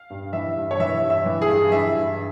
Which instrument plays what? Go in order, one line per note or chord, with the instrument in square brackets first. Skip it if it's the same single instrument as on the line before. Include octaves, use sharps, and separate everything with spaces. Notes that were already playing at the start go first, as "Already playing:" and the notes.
Already playing: [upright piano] F5
G2
E3 E5
G2
C#5
E3 E5
G2
E5
E3
G#4
G2
E3 E5
G2